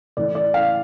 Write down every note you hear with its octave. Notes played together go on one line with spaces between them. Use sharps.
A2 E3 D5
D5
F5